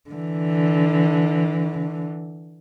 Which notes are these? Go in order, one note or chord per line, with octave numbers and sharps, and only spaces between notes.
D3 E3